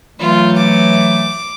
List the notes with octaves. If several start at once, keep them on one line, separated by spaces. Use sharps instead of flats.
E3 F#3 A3 F4
D6